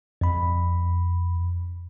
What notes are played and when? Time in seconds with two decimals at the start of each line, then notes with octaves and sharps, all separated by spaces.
0.21 F2 B5